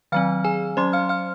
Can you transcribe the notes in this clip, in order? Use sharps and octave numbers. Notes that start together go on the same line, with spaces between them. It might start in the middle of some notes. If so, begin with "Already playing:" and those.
D#3 F#3 C4 F5 F6
G#4 G#5
F#3 C#4 C5 C6
F5 F6
F5 F6